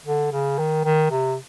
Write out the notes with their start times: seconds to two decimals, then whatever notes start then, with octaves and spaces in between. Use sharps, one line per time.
0.05 D3
0.32 C#3
0.58 D#3
0.85 D#3
1.11 C3